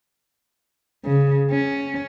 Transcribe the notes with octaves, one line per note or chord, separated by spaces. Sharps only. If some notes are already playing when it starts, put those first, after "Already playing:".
C#3
C#4